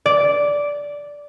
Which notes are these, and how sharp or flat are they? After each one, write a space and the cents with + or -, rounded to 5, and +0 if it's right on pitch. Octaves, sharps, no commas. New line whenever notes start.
D5 -10